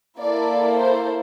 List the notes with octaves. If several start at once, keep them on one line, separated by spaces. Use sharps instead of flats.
A#3 E4 A4 D5
C5